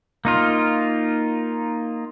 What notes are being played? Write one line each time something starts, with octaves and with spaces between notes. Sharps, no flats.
A#3 D#4 F4